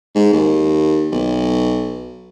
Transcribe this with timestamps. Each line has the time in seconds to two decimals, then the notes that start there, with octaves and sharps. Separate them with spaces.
0.15 G#2
0.33 D#2
1.12 B1